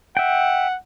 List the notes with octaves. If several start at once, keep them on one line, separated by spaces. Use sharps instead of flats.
E5 F#5 G5